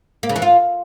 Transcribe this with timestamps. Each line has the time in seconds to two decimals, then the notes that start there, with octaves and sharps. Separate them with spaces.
0.23 A#3
0.29 C#3
0.36 E3
0.42 F4